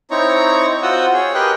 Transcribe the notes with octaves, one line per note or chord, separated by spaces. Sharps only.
C4 D#4 E4 C#5 A#5 C#6
C4 F4 F#4 F#5 D#6 E6
G#4 C#5
G4 A#4 B4 D#5 G5 F#6